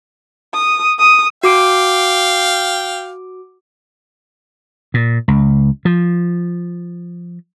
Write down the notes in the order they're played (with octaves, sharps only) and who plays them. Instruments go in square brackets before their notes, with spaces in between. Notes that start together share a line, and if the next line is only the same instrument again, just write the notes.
[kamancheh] D#6
D#6
[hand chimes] F#4 D6 D7 [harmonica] F5 G5
[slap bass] A#2
C#2
F3